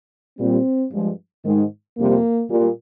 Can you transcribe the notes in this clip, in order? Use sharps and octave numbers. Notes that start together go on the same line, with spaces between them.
A#2 G3 C4
G2 F3 G#3
G#2 D#3 G#3
F2 C3 G3 A#3
A#2 G3